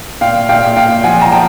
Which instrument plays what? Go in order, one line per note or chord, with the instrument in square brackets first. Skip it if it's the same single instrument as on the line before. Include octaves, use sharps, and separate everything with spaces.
[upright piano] A#2 F5 G5
A#2 F5 G5
A#2 F5 G5
F3 F#5 G#5
A#5
F3 G5 A5